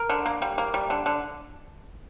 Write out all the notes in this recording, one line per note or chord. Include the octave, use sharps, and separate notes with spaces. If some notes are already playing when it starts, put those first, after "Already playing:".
Already playing: A#4
D3
A#3
G3
A#3
G3
D3
D3